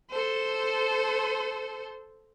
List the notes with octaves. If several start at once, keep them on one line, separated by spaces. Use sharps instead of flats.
A4 C5